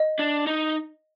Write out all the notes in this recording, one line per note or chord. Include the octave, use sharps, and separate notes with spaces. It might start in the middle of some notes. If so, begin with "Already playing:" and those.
Already playing: D#5
D4
D#4